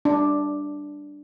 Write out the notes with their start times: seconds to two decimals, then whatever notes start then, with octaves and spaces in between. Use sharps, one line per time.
0.05 D4